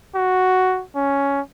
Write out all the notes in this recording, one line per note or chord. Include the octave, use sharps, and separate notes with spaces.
F#4
C#4